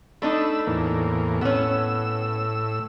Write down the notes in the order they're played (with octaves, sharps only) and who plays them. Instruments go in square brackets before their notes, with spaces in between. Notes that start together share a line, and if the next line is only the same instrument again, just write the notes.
[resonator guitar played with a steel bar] A3 D4 D#4 [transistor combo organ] B5 E6
[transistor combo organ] E2 A2 A#3
[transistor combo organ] A2 E6 [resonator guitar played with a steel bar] B3 C#4